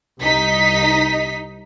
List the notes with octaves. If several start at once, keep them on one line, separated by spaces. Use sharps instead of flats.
C2 D#4 B6